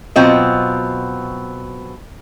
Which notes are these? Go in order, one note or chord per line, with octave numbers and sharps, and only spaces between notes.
B2 F#3 C4 F4 D#5